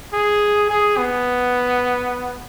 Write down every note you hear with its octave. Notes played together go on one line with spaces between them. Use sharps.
G#4
G#4
B3